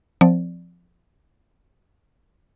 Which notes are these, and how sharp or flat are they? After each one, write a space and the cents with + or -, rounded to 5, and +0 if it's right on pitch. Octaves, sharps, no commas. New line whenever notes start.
F3 +0 C4 -20 D5 +0